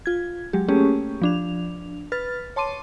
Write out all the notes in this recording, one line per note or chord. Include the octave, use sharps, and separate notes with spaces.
F4 G#6
F#3 G#3 G4
A3 A#3 C#4 G4 G#4
F3 D4 F7
B4 F6 A6
C#5 A5 C6 D6 D#7